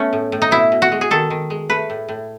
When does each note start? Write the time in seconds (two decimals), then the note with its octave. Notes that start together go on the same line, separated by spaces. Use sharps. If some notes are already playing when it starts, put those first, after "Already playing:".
Already playing: A3 B3 C#4
0.13 A2
0.32 A2
0.42 D#4
0.51 B2 E4
0.72 B2
0.82 F#4
0.92 G#3
1.01 G#4
1.11 D#3 A4
1.30 D#3
1.50 G#3
1.70 A3 B4
1.90 A2
2.09 A2